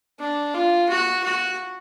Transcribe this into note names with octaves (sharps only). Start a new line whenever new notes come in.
D4
F4
F#4
F#4